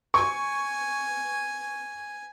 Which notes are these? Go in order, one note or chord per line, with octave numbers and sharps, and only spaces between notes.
G#5 C#6